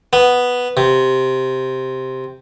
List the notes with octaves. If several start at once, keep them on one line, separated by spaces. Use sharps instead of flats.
B3
C3